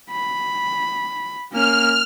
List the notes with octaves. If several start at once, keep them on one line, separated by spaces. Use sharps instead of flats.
B5
A#3 C#4 F6